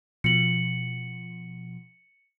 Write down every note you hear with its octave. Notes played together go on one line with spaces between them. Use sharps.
B2 F3 C#7 F#7